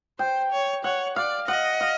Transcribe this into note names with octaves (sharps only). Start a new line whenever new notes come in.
C5 G5
C#5
C#5 F#5
D5 F5
D#5 F#5
F5